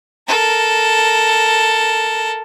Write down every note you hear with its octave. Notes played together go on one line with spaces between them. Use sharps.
A4 A#4